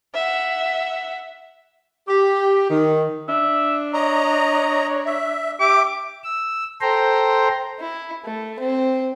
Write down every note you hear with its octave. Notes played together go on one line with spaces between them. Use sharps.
E5 F#5
G4
D#3
D4 E5
C#5 D#5 A#5
E5
G4 E5 D6
E6
A4 C5 G5 A#5 C6
E4
A3
C4